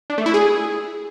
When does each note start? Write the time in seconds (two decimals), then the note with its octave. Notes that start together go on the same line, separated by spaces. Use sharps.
0.10 D4
0.18 A3
0.26 E4
0.34 G#4